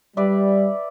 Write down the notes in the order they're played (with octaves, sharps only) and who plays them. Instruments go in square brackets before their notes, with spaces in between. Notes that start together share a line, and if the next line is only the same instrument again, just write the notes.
[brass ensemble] G3 [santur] B4 D5 E5